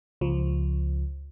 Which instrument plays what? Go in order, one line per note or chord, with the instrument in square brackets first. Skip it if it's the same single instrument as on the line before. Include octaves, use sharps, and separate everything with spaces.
[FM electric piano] C#2 F3